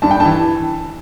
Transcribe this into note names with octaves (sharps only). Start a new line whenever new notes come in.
G2 A5
G5
A5
E3